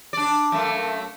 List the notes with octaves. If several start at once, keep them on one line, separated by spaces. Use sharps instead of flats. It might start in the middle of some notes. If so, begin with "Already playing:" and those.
D4 D5
F#2 A3 A#3